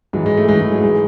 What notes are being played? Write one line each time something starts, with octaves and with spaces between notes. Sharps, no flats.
G#2 E3 F#3
G#3
A3
G#2 E3 G#3
G#3
F#3
G#2 E3 G#3